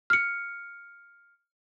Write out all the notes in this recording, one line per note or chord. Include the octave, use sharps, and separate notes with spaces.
F6 C#7